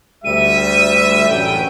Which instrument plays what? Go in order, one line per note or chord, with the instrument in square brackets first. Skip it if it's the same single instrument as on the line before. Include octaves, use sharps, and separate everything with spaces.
[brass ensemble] D2 G3 E5 [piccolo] D#7
[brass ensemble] A1 F#2 G5